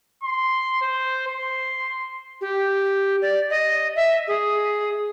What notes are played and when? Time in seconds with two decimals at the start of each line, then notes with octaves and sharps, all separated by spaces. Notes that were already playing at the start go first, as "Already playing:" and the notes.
0.23 C6
0.81 C5
1.27 C6
2.41 G4
3.22 D5
3.50 D#5
3.96 E5
4.28 G#4